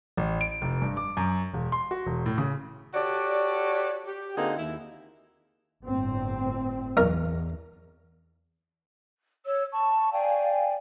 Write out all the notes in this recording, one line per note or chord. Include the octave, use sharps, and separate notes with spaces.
A1
D7
F1
G2
D6
F#2
E1
C6
F#4
E1
A2
C#3
F#4 G4 A4 C#5 D5
G4
D3 A#3 C4 D#4 F#4 G#4
D#2 E4
G1 A2 C4
B1 E2 A#4
C#5 E6
A5 C#6
D5 F5 G5 G#5